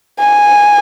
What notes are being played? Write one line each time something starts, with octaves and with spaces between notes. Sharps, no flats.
G#5